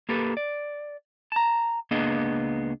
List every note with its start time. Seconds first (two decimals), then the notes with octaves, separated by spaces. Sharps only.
0.09 A#3 G4 A4 B4
0.37 D5
1.32 A5 A#5
1.91 C#2 A#3 B3 D4 G#4 D#5